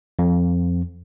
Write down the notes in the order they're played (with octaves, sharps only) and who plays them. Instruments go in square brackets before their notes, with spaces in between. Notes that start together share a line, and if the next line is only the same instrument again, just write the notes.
[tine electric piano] F2